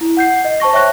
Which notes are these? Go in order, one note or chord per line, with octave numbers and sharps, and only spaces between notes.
E4
F#5 G6 C7
D#5
C5 A5 C#6 A#6
C#5 E5 G5 C#6 F#6 A#6